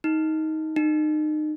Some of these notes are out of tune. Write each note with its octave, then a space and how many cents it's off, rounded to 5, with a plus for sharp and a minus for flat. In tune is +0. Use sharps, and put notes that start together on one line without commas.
D#4 +15
D#4 -30